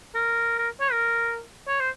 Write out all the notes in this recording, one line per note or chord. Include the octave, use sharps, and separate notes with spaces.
A#4
A#4
C#5
A#4
C#5
C5